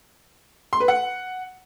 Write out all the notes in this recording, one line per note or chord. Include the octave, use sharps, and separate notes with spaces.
C6
B4
F#5